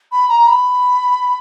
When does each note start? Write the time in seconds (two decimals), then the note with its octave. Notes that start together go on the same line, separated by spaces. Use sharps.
0.12 B5
0.29 A#5
0.47 B5